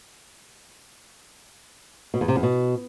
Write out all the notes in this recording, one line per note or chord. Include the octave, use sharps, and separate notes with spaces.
B2
E2
C3
E2
B2